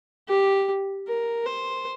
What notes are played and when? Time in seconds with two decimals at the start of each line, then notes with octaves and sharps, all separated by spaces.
0.29 G4
1.08 A#4
1.46 C5